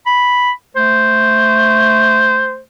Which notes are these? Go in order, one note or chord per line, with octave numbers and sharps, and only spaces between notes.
B5
A3 C5